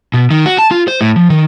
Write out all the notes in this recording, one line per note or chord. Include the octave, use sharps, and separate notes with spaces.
B2
D#3
F#4
A5
F4
C5
A2
F3
D#3